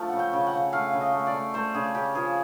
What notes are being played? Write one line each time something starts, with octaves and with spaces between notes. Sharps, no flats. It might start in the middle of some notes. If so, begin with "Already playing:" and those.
Already playing: F3 A3
C#3 F#5
G5
C#3
F#5
C#3
A3 F5
C#3
D#5
A3
D5
A3
A3 C5
C#3 G#4
C#3 G4
F3 G#4